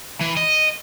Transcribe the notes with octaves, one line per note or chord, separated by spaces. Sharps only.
E3
D#5